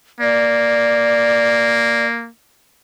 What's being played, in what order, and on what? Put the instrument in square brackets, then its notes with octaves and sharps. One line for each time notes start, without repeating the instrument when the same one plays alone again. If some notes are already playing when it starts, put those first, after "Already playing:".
[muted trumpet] A#3 [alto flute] D5